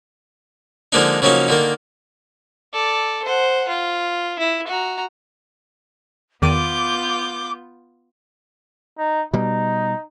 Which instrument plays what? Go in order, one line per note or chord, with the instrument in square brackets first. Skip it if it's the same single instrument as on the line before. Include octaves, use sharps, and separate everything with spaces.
[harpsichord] D3 F3 G#3 A#3 D4 D#4
C#3 F3 F#3 A#3 C#4 D#4
D3 D#3 A#3
[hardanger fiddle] A4 D5
C5 F#5
F4
E4
F#4 A#5
[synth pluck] E2 D#3 D#7 [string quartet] B3 F4 G6 [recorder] D6
[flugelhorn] D#4
[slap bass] B2 G3 [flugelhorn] D#4